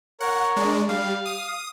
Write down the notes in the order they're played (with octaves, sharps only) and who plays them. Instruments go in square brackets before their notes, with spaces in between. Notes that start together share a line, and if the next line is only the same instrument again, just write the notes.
[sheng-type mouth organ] A#4 C#5 [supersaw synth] F#5
[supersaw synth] G#3 D4
[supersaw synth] G3 [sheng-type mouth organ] F5
[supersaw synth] D#6